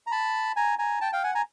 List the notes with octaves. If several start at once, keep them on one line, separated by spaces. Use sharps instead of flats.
A#5
A5 B5
G#5 A#5
G#5 A#5
G5 A5
F5 G5
F#5 G#5
G#5 A#5